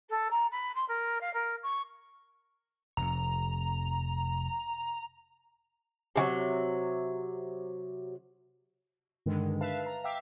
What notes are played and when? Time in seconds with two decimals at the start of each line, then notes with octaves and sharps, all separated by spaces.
0.09 A4
0.31 A#5
0.51 B5
0.75 C6
0.88 A#4
1.21 F5
1.33 A#4
1.63 C#6
2.97 F1 F2 A#5
6.16 C3 E3 F#3
9.26 G2 D3 D#3 G#3
9.61 B4 E5 F5 A5
9.86 A#5
10.04 E5 F5 G5 D6 E6